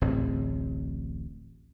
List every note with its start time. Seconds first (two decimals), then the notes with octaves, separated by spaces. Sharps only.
0.01 D1 A1 C4